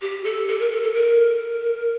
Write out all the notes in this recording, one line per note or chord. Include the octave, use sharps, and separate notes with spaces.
G4
A4
A4
A#4
A4
A4
A#4